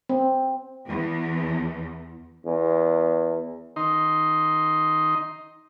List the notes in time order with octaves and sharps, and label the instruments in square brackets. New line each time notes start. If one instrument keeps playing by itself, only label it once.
[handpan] C4
[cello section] E2
[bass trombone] E2
[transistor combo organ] D#3 D#4 C6